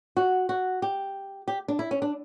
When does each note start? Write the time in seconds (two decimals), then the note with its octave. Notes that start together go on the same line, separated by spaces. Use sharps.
0.17 F#4
0.49 F#4
0.82 G4
1.48 G4
1.68 D4
1.79 E4
1.91 C#4
2.02 D4